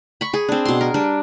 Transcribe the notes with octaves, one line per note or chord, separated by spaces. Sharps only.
B5 C#6
G#4
C4 D4
B2 C6
A#4
G3 D4